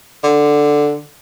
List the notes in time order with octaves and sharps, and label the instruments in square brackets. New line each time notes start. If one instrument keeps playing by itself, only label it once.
[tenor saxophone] D3